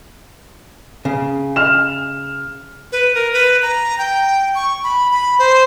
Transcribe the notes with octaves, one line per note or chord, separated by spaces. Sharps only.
C#3
F6 E7
B4
A#4
B4
A#5
G5
C#6
B5
B5
C5